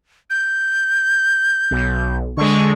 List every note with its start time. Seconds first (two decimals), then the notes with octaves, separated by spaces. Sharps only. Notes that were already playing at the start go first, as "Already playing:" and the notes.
0.30 G6
1.71 B1
2.37 D3 G#3 C#6